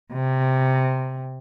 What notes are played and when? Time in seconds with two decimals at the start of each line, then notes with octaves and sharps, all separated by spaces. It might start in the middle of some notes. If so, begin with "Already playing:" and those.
0.13 C3